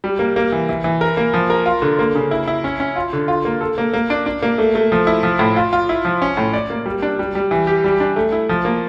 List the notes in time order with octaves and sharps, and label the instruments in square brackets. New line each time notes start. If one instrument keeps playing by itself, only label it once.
[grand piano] G3
A#3
A#3
E3
E3
E3
A#4
A#3
F3
A#4
F4
D3
A#3
C#3
E4
E4
C#4
C#4
F4
D3
F4
A#3
A4
A#3
A#3
D4
D4
A#3
A3
A3
F3
E4
F3
A2
F4
F4
E4
F3
C#4
A2
D5
A#3
G3
D4
G3
G3
E3
G4
G3
D4
A3
E4
F3
A#3